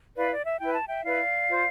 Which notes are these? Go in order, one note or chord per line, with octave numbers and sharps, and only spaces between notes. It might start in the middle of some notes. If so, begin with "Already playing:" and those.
E4 B4 D5 F5
D5
E5
E4 B4 G5
A5
E5 G5
E4 B4 D5 F5
F4 C5